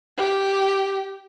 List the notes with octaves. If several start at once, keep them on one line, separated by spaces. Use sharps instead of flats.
G4